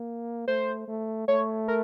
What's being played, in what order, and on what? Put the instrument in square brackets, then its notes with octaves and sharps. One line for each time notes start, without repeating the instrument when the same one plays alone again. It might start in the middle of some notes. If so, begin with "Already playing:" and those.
Already playing: [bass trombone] A#3
[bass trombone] A3 [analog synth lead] C5
[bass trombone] A3
[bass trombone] A3 [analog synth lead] C#5
[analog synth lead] A#4